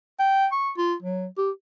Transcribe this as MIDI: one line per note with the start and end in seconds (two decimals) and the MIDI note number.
0.19 0.47 79
0.52 0.71 85
0.77 0.94 65
1.02 1.26 54
1.37 1.50 67